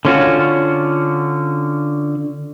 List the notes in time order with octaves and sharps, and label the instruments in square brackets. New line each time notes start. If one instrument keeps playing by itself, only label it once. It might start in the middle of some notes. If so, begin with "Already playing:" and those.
[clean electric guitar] D3 C#4 F4 F#4